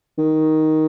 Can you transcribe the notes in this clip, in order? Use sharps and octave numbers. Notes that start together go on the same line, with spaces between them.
D#3